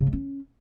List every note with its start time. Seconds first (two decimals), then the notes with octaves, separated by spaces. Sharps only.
0.01 C#3
0.07 G#3
0.13 C#4